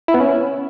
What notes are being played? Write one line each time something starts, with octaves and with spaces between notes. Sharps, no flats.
E4
B3
C#4